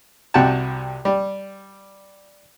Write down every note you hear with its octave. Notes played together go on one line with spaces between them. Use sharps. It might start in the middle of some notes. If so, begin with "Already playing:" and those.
C2 C3 F#4 G5 A5
G3